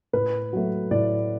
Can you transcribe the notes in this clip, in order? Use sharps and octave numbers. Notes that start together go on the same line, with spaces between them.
A2 B4
F#3 A3
A2 D5